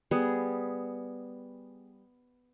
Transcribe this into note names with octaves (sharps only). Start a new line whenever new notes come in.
G3 B3 G#4